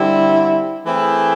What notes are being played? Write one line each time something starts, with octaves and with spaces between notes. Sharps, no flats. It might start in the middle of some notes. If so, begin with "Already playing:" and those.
Already playing: D3 G3 C4 E4
E3 A3 C4 E4 G#4